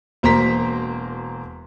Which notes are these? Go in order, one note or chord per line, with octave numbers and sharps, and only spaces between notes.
E1 A#3 C5 A#5 C6 B6